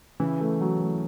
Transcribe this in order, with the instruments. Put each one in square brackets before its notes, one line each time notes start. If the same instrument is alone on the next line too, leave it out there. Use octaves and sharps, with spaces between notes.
[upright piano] C#3 [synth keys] E3
[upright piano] A3
F#3
A3